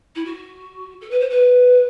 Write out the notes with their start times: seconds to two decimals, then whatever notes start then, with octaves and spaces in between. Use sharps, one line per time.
0.15 E4
0.25 F#4
1.01 A4
1.10 B4
1.20 C5
1.29 B4